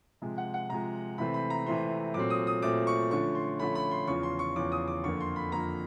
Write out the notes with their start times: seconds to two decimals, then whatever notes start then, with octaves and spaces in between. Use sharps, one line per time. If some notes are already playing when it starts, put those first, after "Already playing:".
0.22 C3 F3 G#3
0.38 F#5
0.54 F#5
0.69 C3 F3 G#3 A#5
1.18 C3 E3 A3 C4 B5
1.34 B5
1.50 A#5
1.66 C3 E3 A3 C4 C6
2.14 A#2 F#3 A3 C4 D6
2.30 D#6
2.47 D#6
2.62 A#2 F#3 A3 C4 D6
2.87 C#6
3.11 D3 F3 A3 C#4 C#6
3.35 C6
3.59 D3 F3 A3 C#4 B5
3.75 B5
3.91 C6
4.07 E2 C#3 F3 C#6
4.23 C6
4.39 C#6
4.56 E2 C#3 F3 D6
4.72 D#6
4.87 D6
5.04 F2 D3 F3 A#3 C#6
5.20 C6
5.36 B5
5.52 F2 D3 F3 A#3 A#5